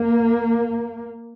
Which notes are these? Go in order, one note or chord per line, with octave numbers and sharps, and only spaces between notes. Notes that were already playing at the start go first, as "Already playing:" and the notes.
Already playing: A#3